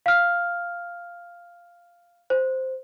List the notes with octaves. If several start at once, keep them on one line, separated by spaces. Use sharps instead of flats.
F5 F6
C5